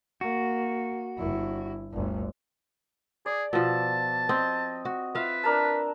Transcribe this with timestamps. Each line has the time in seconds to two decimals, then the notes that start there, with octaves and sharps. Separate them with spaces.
0.21 A#3 F#4
1.17 G1 E4
1.92 G1 D2
3.26 G#4 D5
3.53 B2 F3 A5 E6
4.29 C4 D#5
4.85 F#4
5.15 F4 B4 E5 F5
5.43 D4 A#4 A5